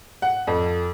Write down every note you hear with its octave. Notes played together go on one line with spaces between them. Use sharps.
F#5
F2